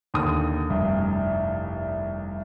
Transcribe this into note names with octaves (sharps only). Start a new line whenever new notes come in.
D#2 D3 D#6
F1 C2 G2